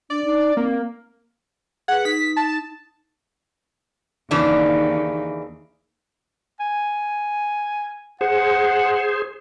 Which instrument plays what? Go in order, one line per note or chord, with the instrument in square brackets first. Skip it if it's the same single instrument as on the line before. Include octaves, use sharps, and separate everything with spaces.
[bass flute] D4 [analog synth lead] D5
[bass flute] D#4
[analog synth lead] A#3 [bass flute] C4
[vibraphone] G#4 B4 [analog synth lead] F#5
[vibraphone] D#4 [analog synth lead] B6
[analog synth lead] A5
[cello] D#2 D#4 [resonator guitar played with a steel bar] C#3 E3 D4
[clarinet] G#5
[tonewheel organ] G#4 C5 [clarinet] F#5